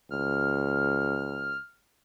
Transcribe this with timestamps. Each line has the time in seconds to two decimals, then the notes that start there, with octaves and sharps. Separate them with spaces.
0.11 C#2 F6